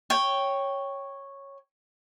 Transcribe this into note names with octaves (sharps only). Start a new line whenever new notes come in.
C#5 G5